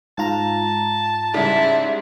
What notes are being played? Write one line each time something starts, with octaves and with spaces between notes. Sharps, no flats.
G#2 F4 A5 A#5
G#2 C#3 G3 E4